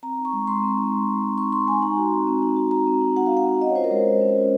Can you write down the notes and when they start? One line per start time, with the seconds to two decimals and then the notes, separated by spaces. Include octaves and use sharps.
0.03 C4 A#5
0.18 D#4
0.25 C#6
0.33 G#3
0.47 G#3 C6
0.63 C4
0.77 D#4
0.92 G#3
1.08 G#3
1.22 C4
1.37 D#4 C#6
1.52 G#3 C6
1.67 G#3 G#5
1.82 D#4 A#5
1.97 F#4
2.12 C4
2.27 C4
2.42 D#4
2.56 F#4
2.71 C4 A#5
2.87 C4
3.01 D#4
3.16 F#4 F#5
3.26 C4 F5
3.37 F#5
3.45 C4
3.61 C#4 D#5
3.69 C#5
3.75 F4 C5
3.84 A#4
3.91 G#3
4.05 G#3
4.21 C#4
4.36 F4